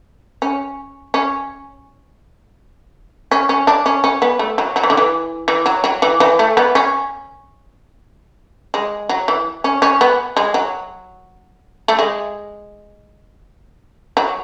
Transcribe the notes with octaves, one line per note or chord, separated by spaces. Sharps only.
C#4
C#4
C#4
C#4
D4
C#4
C#4
B3
A3
F#3
F#3
E3
D3
E3
E3
F#3
F#3
E3
E3
A3
B3
C#4
G#3
F#3
E3
C#4
C#4
B3
G#3
F#3
A3
G#3
F#3